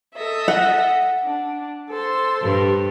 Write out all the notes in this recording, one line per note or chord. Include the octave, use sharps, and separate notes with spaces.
A4 D#5 E5
F#5
D4
A4 C5 C6
G2